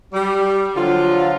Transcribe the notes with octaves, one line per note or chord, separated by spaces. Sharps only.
G3
D3 F3 F#3 F4